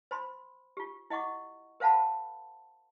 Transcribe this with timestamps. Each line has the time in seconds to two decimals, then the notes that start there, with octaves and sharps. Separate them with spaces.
0.11 C5 B5 C6
0.77 F4 G4
1.10 E4 D#5 F#5 C#6 D6
1.80 A#4 C5 F5 F#5 A5 B5